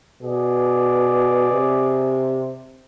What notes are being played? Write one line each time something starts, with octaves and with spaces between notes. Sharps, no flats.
B2 G#4 D5
C3